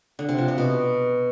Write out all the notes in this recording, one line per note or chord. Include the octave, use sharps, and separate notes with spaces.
D3
C3
F3
C3
B2